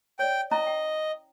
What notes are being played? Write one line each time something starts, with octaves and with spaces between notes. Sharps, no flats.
C#5 D5 G5
C#4 E4 D#5 A#5
G5